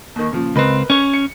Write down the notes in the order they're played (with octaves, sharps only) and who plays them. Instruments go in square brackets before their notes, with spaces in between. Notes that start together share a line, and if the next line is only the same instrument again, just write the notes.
[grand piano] D#2 D#3
A#2 C#3 F3
[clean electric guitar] C#2 C4 [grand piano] A#4 B4 D#5
[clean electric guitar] C#4 C#5
[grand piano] C#7